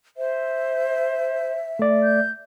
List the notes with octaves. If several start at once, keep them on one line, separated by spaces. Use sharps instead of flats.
C5 E5
A3 D5
G6